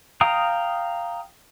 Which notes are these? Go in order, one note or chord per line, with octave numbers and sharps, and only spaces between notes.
F5 G5 A#5 D#6